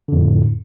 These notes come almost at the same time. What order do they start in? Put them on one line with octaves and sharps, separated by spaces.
D3 F2 A2